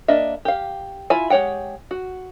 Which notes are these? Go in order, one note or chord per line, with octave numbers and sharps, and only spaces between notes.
A#3 D4 D#5 E5
G4 F5
E4 F4 E5 G#5
G#3 G4 C#5 F#5 G5
F#4